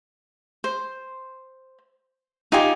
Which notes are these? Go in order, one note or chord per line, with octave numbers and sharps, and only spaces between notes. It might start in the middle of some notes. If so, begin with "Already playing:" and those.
C5
D#4 F4 G4 G#5